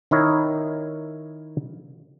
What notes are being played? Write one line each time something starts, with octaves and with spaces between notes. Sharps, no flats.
D#3 D#4 E4 A#4 C#5